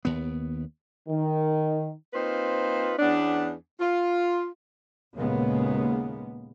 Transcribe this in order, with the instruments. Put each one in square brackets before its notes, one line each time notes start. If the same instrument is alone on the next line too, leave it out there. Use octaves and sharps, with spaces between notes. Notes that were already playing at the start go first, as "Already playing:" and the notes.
[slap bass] D#2 B3
[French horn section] D#3
[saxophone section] A#3 C4 D#4 F4 B4 C5
E2 B3 C#4 D4
F4
[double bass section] D#2 A#2 C#3 G#3 A#3 B3